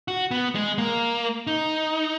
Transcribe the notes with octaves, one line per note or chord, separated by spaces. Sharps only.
F#4
B3
G#3
A#3
D#4